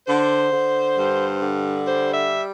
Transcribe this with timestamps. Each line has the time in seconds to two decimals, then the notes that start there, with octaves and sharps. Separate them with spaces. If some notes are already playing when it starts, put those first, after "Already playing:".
0.07 D3 C5
0.52 D3
0.96 G2
1.40 D3
1.85 G3 C5
2.14 E5